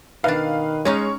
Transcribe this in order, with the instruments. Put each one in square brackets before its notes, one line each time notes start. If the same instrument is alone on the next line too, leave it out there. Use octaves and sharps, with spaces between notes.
[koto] B2 D4 [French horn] D#3 [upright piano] B4 [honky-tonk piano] F5
[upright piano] G#3 [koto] C#4 D#4 F5 [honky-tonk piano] C#5